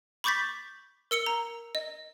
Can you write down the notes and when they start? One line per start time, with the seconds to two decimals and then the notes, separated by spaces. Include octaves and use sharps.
0.24 B5 C#6 D6 G6 A6 B6
1.11 A#4 E6 C#7 G7
1.26 A#5
1.75 D#5